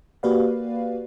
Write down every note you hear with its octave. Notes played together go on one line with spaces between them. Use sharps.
A#3 F#4 G4 B4 D5 F5